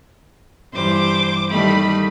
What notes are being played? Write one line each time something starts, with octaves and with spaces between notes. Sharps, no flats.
G2 E3 C5 D6
D#3 G3 A3 B5